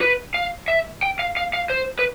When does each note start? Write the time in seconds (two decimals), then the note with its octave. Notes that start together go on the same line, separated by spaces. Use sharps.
0.01 B4
0.34 F5
0.68 E5
1.03 G5
1.19 F5
1.37 F5
1.53 F5
1.70 C5
1.99 B4